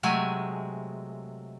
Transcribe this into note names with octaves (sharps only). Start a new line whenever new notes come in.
C3 F#3 G#3 A3 G#5